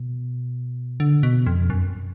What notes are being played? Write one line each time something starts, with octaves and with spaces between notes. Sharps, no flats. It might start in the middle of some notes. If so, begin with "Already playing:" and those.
Already playing: B2
D3
B2
F2
F#2